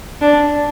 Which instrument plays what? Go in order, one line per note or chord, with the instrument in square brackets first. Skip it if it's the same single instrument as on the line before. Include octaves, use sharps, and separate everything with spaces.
[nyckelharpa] D4